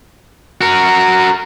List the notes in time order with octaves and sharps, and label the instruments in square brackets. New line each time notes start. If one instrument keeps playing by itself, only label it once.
[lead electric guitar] F#4 A#4